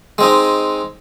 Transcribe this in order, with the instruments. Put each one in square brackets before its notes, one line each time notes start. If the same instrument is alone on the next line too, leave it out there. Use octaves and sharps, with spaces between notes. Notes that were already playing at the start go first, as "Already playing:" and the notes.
[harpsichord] G#3 C4 D#4